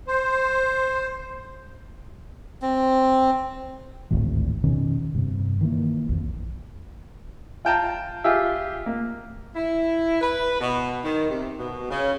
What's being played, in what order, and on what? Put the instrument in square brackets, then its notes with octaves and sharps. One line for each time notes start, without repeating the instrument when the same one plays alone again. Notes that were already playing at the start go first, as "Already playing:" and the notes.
[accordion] C5
[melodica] C4
[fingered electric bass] G#1 D2 A2 E3
F2 B2 D#3 C#4
G2 C3
D#3 E3 A#3
A#1 F2
[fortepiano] F4 G5 A5 A#5
F4 G4 G#4 E5
A#3
[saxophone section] E4
B4
B2
D#3
C3
B2
C#3